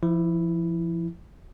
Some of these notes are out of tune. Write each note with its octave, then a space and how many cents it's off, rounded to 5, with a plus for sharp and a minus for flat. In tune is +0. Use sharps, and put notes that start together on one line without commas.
F3 -35 E4 +0